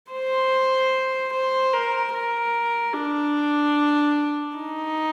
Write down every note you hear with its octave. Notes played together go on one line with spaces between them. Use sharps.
C5
C5
A#4
A#4
D4
D#4